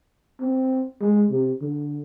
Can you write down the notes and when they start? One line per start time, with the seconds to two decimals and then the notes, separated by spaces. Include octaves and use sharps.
0.41 C4
1.01 G#3
1.30 C3
1.61 D3